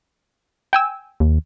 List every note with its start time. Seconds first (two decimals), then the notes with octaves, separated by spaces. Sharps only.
0.73 G5 G#5 E6
1.20 D#2